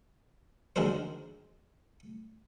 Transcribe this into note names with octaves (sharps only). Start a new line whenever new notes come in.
D#2 D3 G#3 D4 A#4 C5